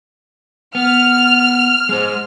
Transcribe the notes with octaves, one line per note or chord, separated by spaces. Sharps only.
B3 F6
G#3 C5